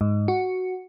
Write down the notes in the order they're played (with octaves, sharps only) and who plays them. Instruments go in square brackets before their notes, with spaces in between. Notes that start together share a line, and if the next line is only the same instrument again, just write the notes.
[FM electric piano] G#2
F#4